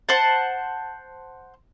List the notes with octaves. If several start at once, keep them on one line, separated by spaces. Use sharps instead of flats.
C5 F#5 A5